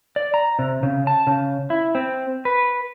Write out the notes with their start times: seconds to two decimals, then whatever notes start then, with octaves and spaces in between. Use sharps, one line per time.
0.16 D5
0.34 A#5
0.59 C3
0.83 C#3
1.07 A5
1.27 C#3
1.70 E4
1.95 C4
2.45 B4